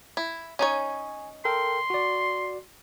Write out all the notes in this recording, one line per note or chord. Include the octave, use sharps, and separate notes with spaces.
E4
C#4 D#4 C#5 G#5
A4 A#4 G5 C6
F#4 D5